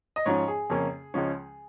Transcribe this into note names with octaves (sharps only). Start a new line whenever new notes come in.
D#5
G#2 F3 C#4 C#5
G#4
F2 C#3 A#3 C#4
C#2 C#3 F3 G#3 C#4